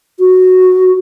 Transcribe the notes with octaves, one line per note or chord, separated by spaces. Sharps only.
F#4